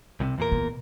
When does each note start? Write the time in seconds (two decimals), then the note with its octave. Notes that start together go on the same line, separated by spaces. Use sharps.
0.20 C2 A2 C3
0.38 E2 A#2 A#4
0.52 B2